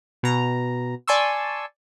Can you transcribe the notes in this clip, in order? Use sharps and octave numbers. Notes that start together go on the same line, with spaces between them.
B2 A#5
D5 G#5 A5 C6 C#6 E6